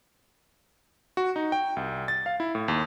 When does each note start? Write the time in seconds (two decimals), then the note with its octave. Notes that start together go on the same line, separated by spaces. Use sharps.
1.17 F#4
1.36 D#4
1.52 G5
1.77 C2
2.08 A6
2.26 F5
2.40 E4
2.55 A2
2.68 D#2